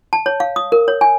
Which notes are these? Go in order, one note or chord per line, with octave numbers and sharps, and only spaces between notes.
A5
C#5
F5
D#6
A#4
C#5
G#5